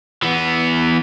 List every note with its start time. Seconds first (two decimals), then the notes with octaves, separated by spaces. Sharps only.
0.23 E3 B3